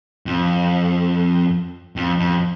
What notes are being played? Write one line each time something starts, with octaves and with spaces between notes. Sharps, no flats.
F2
F2
F2